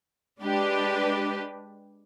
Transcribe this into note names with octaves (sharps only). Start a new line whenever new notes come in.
G#3 D4 G4 B4